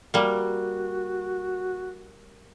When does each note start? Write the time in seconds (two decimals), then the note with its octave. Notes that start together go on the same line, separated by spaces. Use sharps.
0.14 G3 A#3 F#4